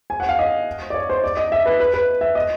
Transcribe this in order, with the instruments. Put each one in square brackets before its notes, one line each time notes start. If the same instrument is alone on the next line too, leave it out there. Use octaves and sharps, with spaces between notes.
[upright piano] G#5
F#5
F5
D#5
D5
C#5
C5
D5
D#5
E5
B4
B4
B4
E5
D#5